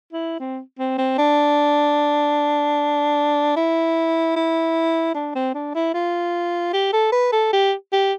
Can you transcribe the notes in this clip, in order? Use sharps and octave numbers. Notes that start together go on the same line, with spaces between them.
E4
C4
C4
C4
D4
E4
E4
D4
C4
D4
E4
F4
G4
A4
B4
A4
G4
G4